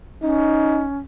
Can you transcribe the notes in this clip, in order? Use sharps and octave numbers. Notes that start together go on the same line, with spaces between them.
C#4 D#4